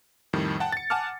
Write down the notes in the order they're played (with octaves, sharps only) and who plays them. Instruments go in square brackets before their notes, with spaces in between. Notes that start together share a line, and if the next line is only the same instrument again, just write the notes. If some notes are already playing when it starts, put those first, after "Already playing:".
[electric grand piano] F2 A2 D#3 G3
F#5 G5 A5
A6 C#7
F#5 G#5 A5 D6 F6